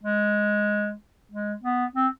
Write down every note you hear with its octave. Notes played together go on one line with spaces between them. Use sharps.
G#3
G#3
B3
C4